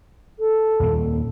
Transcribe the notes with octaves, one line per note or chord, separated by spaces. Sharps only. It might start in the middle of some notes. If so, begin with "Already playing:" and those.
A4
D#2 A#2 A#3